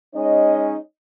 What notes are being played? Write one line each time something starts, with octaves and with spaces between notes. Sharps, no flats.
G#3 C#4 D#4 C#5 D#5